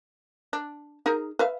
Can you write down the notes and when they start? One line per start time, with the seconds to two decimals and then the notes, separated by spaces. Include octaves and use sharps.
0.53 D4
1.06 D#4 G#4 A#4
1.39 B4 E5 F5